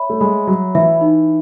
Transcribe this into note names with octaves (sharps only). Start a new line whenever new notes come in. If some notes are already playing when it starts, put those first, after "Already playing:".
Already playing: C#5 E5 B5
A3
G#3 B5
F#3 F#4
E3 E5
D#4